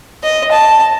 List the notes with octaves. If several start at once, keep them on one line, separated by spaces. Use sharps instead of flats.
D#5
A5